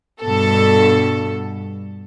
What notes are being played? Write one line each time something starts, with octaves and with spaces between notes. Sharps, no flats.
G2 B2 A4